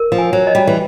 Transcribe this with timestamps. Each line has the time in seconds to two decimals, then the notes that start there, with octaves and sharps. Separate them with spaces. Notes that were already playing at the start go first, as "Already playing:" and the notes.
Already playing: A#4
0.12 F3
0.18 G#5
0.33 F#3
0.47 D#5
0.55 G3
0.67 E3